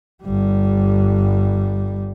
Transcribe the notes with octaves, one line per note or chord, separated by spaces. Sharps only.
G1 G3